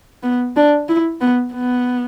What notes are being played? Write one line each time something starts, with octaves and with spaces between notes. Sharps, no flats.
B3
D4
E4
B3
B3